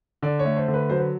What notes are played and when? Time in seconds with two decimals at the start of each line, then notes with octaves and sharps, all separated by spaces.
0.22 D3 D5
0.39 C#5
0.45 A3
0.56 C5
0.68 D3
0.74 B4
0.90 F#3 C5
0.98 B4